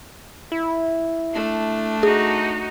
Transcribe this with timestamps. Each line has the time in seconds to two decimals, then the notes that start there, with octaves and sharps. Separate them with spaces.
0.52 E4
1.33 A3 D4
2.03 D#4 F#4 G#4